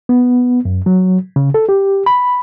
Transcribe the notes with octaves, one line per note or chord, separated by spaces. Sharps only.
B3
F#2
F#3
C#3
A4
G4
B5